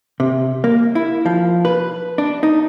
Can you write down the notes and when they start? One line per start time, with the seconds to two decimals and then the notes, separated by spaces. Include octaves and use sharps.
0.20 C3
0.64 A#3
0.95 E4
1.26 F3
1.65 B4
2.18 D4
2.43 D#4